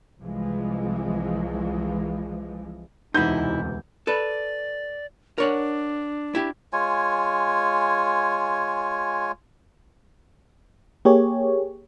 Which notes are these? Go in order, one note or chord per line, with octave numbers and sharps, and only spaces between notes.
C2 E3 F3 G#3
E1 D2 C3 E3 D#4 E4 F#5 G6
A4 B4 D5
D4 A#4 C#5 F#5
E4 G4
G#3 F4 C#5 G#5
A#3 G4 G#4 C#5